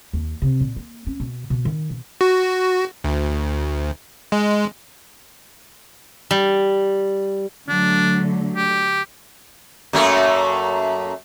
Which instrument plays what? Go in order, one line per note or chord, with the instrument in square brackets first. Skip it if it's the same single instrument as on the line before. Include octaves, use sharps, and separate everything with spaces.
[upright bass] D#2
C3
A#2
A#3
C#4
B2
B2
D#3
B2
[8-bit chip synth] F#4
D2
G#3
[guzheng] G3
[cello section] D3 F#3 A3 [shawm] D4
[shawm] G4
[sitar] F#2 A3 A#3